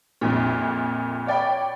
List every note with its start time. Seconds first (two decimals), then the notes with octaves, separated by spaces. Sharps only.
0.21 A#1 F2 A#2
1.27 C#5 D5 G5 B5